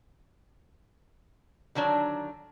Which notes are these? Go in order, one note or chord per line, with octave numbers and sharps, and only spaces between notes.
D3 D#3 F#3 D4